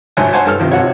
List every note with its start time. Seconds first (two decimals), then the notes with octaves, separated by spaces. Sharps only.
0.17 G#1 G2 C#5 E5 G#5
0.33 C5 C#5 F#5 G#5 A5
0.45 G2 A4 F6
0.60 C3 D#3 F3
0.72 G#1 C3 F#4 C#5